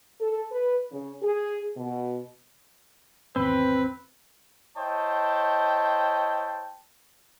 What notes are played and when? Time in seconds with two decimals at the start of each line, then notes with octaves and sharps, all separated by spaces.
0.21 A4
0.51 B4
0.92 C#3
1.22 G#4
1.77 B2
3.36 G#1 E2 C4 B4
4.77 E4 C5 C#5 D#5 G5 A5